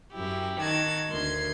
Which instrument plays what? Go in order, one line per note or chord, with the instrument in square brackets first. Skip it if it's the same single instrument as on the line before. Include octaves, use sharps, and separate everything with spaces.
[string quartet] F#2 E4 G4
D#3 F#4 A5 G#6
D2 D#3 C6 G#6